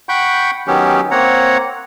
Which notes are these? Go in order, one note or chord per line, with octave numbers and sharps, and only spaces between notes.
F#5 G5 B5 C#6 G6
D#3 F#3 B3 C#4 G4
A#3 C4 C#5 F#5 A#5